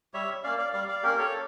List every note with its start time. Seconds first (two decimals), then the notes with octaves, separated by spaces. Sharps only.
0.14 G3 C#5 E5
0.44 A#3 C#4 D5 F5
0.58 D5 F5
0.73 G3 D5 F5
0.88 D5 F5
1.03 A#3 C#4 G4 A#4
1.18 A4 C#5